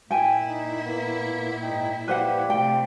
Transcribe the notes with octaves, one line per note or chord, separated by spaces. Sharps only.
A#2 E4 G5 G#5
D#4
A#3 B3
G#2 D#4 G5
F3 G3 G4 B4 C5 F#5
C3 A3 G5